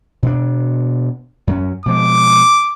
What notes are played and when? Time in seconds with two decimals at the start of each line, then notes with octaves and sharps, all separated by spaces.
0.23 B2 D4
1.47 F#2 F#3 C#4
1.86 B2 F3 G#3 D6